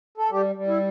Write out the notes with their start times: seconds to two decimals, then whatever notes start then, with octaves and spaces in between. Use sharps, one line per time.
0.18 A4
0.31 G3 G4
0.55 G3
0.67 E4